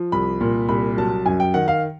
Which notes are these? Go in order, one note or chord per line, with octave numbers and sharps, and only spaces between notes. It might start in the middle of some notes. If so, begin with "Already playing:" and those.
Already playing: F3
C2 B5
A#2
C2 B5
F#3 A5
F#2 G#5
G5
D#3 F#5
F5